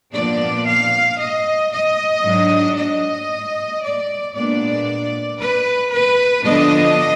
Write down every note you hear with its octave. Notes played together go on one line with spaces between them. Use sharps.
A#2 F3 B3 D4 D5
F5
D#5
D#5
G#2 F#3 D4
D#5
D5
A#2 G#3 B3 D4 D5
B4
B4
D3 F3 B3 D4 D#5